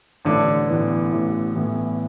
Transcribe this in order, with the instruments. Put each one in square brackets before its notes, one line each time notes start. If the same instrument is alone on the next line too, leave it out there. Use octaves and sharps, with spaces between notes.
[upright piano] A1 [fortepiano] D3
[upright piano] A2 E3 B3
A1
A2 E3 B3